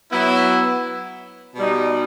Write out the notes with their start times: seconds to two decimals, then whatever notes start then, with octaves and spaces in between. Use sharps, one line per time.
0.11 F#3 B3 E4
1.55 B2 G3 D#4